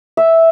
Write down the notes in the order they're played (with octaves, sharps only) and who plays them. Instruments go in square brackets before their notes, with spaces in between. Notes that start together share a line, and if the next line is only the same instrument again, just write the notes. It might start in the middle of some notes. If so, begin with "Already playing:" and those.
[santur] E5